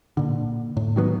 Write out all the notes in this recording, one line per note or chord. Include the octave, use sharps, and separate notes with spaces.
A#2 D3
A2
D#3 F#3 A#3 B3